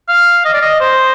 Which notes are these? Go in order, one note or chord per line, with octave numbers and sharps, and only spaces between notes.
F5
D#5
D5
D#5
C5